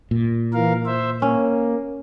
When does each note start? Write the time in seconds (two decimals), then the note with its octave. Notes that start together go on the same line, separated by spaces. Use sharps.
0.11 A#2
0.54 E3 A#4 F5
0.86 C5 E5
1.22 A#3 C#4